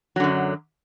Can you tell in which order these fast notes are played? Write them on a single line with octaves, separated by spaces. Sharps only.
F#3 D3 F#2